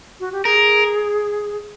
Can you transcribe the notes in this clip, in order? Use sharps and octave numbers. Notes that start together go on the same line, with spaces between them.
F#4
G4
G#4 A#4